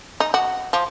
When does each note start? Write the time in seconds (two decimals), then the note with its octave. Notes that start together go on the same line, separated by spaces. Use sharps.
0.20 D#4
0.34 F#4
0.73 F3